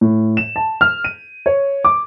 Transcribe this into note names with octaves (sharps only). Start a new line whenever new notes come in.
A2
E7
A5
F6
D#7
C#5
D6